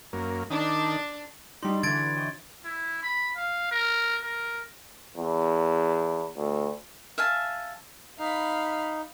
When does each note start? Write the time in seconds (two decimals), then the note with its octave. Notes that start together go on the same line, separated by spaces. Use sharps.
0.13 F#2 A#3
0.50 D#3 D4
1.63 G3 D4 D#4 F#4 D5 C6
1.83 D3 E3 G#6 A6 D7
2.16 C#5 D#5 G5
2.65 E4
3.03 B5
3.36 F5
3.71 A#4
4.23 A#4
5.17 E2
6.37 D2
7.18 E5 F5 G#5 A5
8.19 D#4 F5 B5